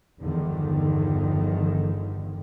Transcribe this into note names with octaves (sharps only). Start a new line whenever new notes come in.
G1 E2 G2 D3 D#3 F3